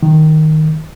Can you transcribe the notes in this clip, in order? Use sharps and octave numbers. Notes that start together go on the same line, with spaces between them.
D#3